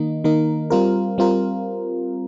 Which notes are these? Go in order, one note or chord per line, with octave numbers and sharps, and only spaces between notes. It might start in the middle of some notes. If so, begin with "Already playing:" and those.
Already playing: D#3 A#3 D#4
D#3 A#3 D#4 A#4
G3 C4 F4 A#4
G3 C4 F4 A#4